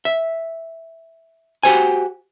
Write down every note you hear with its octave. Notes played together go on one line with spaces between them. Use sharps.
E5
F#4 G4 C5 G#5